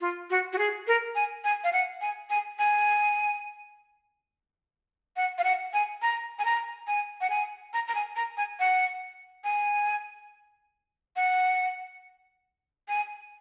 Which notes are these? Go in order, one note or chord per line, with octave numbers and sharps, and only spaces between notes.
F4
F#4
F#4
G#4
A#4
G#5
G#5
F5
F#5
G#5
G#5
G#5
F#5
F5
F#5
G#5
A#5
G#5
A#5
G#5
F#5
G#5
A#5
A#5
G#5
A#5
G#5
F#5
G#5
F#5
G#5